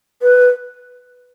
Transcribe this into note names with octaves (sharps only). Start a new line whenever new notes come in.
B4